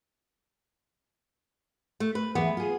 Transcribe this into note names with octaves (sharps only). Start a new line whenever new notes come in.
A3
B4
E2 E3 G#3 B3
F4 G#4